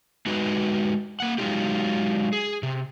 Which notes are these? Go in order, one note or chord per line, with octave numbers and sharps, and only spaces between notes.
G#3 D#4 F#4 B4
A#3 F#5
F#3 G#3 D#4 F4 G4
G#4
C3